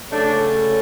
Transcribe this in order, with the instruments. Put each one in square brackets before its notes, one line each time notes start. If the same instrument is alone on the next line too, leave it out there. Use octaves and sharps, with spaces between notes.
[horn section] C#3 F#3 A3 D4